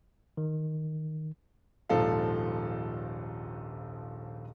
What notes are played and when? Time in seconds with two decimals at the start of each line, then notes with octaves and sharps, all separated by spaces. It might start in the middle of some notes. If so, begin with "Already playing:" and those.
0.37 D#3
1.90 D#1 A#1 G#2 F3 A4 F5